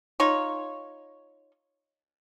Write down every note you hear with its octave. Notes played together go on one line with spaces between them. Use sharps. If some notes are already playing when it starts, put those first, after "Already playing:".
D#4 F4 C#5